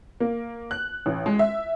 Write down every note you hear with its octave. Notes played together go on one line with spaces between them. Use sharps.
A#3
F#6
A1
G#3
E5